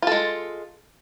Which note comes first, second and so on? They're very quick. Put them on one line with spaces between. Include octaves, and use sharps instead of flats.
F4 A4 G#3